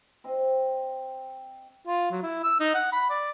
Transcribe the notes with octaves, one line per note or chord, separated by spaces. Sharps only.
C4 C5 D#5
F4
F#3
E4
E6
D#4
F#5
B5
D5